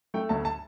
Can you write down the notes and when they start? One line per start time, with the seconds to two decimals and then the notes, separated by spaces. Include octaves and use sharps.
0.14 A3 G5
0.29 D2 A5
0.45 A5